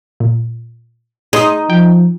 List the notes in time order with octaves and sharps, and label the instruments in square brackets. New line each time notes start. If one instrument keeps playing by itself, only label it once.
[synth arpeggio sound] A#2
[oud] D#4 [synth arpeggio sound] G#4 C6 D#6
[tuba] F3 [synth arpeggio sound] G5